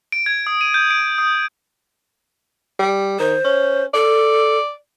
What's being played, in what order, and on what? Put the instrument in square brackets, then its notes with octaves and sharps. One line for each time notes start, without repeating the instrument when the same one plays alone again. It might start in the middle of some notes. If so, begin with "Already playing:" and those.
[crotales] D7
G#6
D#6
D#7
G6
D7
D#6
[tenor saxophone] G3
[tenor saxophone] D#3 [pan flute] C5
[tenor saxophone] C#4
[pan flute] A4 [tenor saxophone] D5